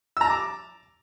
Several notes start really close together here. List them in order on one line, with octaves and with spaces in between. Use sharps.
E6 A#5 A5 D6